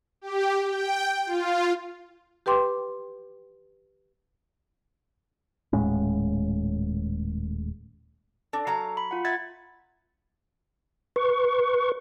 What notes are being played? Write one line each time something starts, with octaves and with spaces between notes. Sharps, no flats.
G4
G5
F4
G4 B4 G5 C6 D6
D#1 A2 G#3 C#4
D4 A4
F#3 F5 A#5
B5
F4 F#5
E5 F#5 G#6 A6
B4 C#6